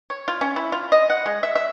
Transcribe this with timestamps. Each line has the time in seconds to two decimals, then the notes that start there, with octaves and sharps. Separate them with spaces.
0.10 C#5
0.28 F4
0.41 C#4
0.56 E4
0.72 F4
0.92 D#5
1.10 F#5
1.26 G#3
1.43 E5
1.55 E5